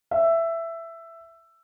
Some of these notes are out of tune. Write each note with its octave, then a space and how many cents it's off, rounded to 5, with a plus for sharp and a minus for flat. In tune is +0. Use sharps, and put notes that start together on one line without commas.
E5 +10